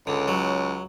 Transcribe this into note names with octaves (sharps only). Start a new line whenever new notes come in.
C#2 D3
F#3